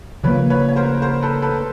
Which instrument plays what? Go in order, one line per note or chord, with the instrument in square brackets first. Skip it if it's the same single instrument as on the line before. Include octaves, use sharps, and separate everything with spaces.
[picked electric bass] C#3 F3 A#3 [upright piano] B4 C#5
[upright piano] B4 C#5
C#5
A#4 C5
A#4 C5
A4 B4
A4 B4